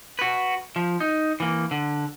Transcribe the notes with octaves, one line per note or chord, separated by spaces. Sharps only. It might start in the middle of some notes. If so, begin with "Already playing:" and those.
F#4 B4
F3
D#4
E3 A#3
D3